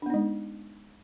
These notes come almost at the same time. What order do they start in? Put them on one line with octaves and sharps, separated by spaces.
D4 B3 D#4 G#3